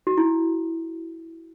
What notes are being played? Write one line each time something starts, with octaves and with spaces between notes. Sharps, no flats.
F#4
E4